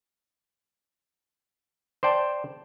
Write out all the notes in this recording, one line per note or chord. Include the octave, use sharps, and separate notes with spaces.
C5 D5 G5 A5